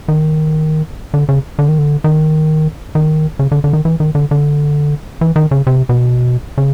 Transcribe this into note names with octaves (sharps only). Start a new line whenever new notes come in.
D#3
D3
C#3
D3
D#3
D3
D#3
D#3
C#3
D3
D3
D#3
E3
D#3
D3
D3
E3
D#3
C#3
C3
B2
C#3